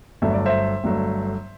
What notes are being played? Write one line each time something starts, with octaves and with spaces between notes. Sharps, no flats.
G1 G2 F#3 A3 E5
D5
C5 E5
G1 G2 F#3 A3